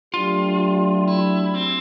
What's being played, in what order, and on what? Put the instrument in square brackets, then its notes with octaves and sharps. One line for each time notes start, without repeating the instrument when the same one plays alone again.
[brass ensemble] F#3 A3 D4 G4 [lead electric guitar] F4
[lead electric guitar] E4
C4